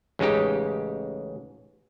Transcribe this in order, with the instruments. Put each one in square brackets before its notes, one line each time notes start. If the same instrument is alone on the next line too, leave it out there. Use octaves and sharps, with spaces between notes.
[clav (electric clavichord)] A1 C#3 G#3 D#4 G4